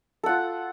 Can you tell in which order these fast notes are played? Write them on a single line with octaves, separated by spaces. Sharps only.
A4 F#5 F4